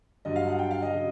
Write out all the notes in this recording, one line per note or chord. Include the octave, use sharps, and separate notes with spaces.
G2 D3 F#3 D#5
F5
F#5
G5
F5
D#5
C#3 F#3